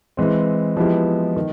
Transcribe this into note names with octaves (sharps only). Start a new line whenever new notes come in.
E3 G#3 C4
F3 G#3 B3 E4 G4
D#3